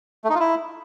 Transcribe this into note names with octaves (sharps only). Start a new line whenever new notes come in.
A3
D#4
F4
E4